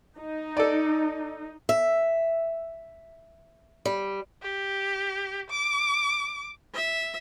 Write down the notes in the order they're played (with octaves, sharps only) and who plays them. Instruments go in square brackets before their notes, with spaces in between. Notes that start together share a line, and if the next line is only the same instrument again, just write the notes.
[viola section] D#4
[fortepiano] A4 D5
[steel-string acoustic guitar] E5
G3
[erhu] G4
D6
[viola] E5